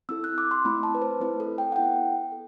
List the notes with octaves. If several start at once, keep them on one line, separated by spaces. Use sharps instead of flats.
C4 E4 A4 E6
F#6
D6
C6
A3 C4 E4 B5
A5
B4
C5
A3 C4 E4 B4
A4
G5
F#5
B3 E4 A4 G5
A4